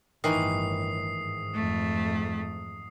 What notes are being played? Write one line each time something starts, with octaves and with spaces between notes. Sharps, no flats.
G1 A2 D#3 E3 D#6 C7
G#2
F2 A3